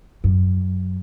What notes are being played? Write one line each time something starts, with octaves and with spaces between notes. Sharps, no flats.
F#2